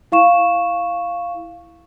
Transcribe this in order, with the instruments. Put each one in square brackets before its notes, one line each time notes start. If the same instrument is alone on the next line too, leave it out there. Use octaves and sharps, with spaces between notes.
[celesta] E4 F5 C#6 E7